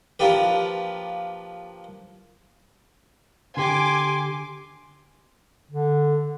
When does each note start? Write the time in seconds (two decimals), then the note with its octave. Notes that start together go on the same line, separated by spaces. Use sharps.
0.19 F3 A#3 D4 F4 G4 B4
3.57 D3 G4 G#5 C6 D6
5.71 D3